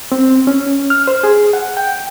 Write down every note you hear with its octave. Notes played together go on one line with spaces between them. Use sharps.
C4
C#4
F6
C5
G#4
F#5
G5